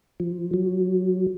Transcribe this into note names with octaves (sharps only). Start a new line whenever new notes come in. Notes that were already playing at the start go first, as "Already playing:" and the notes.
F3
F#3